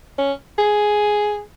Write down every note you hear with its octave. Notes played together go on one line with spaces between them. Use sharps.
C#4
G#4